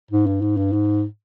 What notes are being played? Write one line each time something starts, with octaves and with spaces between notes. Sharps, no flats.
G#2
G2
G#2
G2
G#2